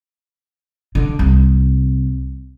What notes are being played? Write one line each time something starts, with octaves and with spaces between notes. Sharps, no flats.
D3
C2